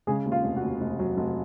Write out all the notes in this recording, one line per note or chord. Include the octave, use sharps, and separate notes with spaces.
C#3 G#3 G#4
D#2
F4 F5
F1
F#4 F#5
D#2
F1
F#3
F1